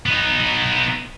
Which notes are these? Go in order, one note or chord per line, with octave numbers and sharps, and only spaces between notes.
B3 D#4